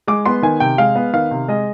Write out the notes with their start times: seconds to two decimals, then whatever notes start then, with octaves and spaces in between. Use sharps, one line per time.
0.07 G#3 D6
0.26 B3 C6
0.42 D#3 G#5
0.60 C3 G5
0.78 G#3 F5
0.96 B3
1.13 D#3 F5
1.31 C3
1.48 G#3 D#5